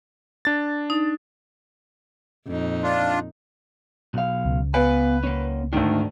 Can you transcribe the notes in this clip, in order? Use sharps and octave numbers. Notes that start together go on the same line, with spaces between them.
D4 A6
D#4
F2 A#2 D#4
D4 F4
B1 F5
C#2
B3 B4 F5 G#5
A#3 C#4
D2 G#2 D#3 A3 D4